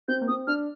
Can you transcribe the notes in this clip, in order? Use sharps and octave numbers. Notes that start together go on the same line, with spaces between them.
C4 G6
A#3
C4 D#6
D4 F6